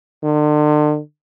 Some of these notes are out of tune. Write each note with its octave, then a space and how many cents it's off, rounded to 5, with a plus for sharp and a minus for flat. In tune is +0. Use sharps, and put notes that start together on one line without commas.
D3 +40